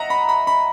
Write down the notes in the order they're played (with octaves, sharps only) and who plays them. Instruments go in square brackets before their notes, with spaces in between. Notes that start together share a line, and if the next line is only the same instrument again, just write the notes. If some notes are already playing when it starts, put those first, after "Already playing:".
Already playing: [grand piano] D#5 E5 F#5 A#5
B5
B5
B5